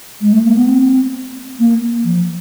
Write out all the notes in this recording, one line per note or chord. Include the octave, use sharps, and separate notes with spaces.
G#3
A3
A#3
B3
C4
A#3
F3